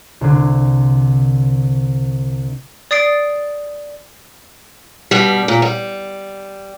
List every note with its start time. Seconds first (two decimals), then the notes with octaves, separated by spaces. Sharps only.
0.21 C2 D3
2.91 D5 D#6 A6 C7 D7
5.11 G2 B2 G3
5.48 A#2
5.62 G3